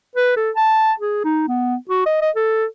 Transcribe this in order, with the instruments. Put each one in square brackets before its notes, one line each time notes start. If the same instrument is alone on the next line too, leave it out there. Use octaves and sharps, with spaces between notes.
[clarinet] B4
A4
A5
G#4
D#4
B3
F#4
D#5
D#5
A4